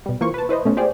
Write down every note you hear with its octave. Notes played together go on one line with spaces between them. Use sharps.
B2 G3
E3 A#3 F4 C5 C#6
B4 A5
E4 B4 C5 D#5
B2 A3 C#4
F4 G4 G#4 C5 D5